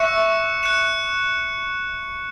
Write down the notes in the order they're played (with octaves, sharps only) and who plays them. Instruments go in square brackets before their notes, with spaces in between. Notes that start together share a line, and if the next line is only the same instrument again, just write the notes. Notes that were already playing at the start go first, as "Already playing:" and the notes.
Already playing: [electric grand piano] E5 [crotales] C#6 F#6 C#7 E7
[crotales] F#6 C#7 E7